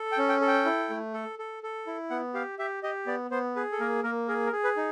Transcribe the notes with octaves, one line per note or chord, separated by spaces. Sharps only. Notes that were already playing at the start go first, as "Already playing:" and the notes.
Already playing: A4
G5
C#4
G5
A4
G5
E4
A3
A4
A4
A4
E4
B3 F#5
G4 F5
G4 E5
G4 D#5
B3 D5
B3 C5
G#4 B4
A4
A#3 A#4
A#3 A#4
G#4 A#4
A#4
G#4
B4
D#4